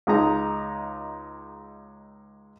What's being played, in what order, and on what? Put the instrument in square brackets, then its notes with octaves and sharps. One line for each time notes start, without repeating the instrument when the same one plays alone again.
[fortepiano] C#2 G#3 D#4 A#5